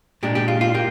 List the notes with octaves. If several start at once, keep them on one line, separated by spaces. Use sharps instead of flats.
A#2 G#3 D4 G4
G4
F4
F4
A#3 G4